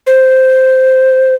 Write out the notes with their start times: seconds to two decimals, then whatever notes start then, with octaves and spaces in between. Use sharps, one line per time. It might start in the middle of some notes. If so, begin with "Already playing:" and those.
0.07 C5